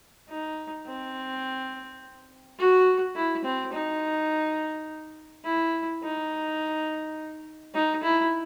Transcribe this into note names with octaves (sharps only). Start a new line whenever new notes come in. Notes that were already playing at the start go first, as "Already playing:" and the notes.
D#4
C4
F#4
E4
C4
D#4
E4
D#4
D#4
E4